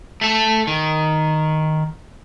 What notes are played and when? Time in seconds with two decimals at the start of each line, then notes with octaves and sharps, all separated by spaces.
0.21 A3 A4
0.67 D#3